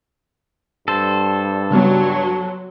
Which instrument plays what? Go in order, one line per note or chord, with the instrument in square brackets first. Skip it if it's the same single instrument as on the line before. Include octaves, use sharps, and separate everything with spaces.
[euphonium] G2 [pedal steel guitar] A4 C5
[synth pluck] C#3 G3 B3 [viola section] F#3